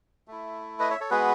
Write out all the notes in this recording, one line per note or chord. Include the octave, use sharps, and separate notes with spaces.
A3 E4
B4 D#5
C#5 E5
A4 C#5
G#3 B3 F#4 G#4 B4